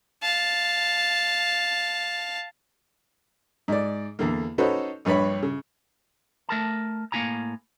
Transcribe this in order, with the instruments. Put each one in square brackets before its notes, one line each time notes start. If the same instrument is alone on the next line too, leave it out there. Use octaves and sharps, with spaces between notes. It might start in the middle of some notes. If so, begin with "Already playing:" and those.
[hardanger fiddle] F5 A5
[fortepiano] G#2 D5
E2 D3 A#3
C#4 D#4 F#4 A4 B4 C5
A#1 G2 B4 C#5 B5
C#3
[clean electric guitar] A3 A#4 A5
A2 A#3 B3 E4 G#5 A#5